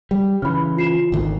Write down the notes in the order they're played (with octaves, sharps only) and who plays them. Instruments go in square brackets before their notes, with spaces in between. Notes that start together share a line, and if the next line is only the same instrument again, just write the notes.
[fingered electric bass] G3
[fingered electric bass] C#3 E3 [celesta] B5 F6
[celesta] F4 C7 E7
[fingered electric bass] G#1 D2 D#3 [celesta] D#4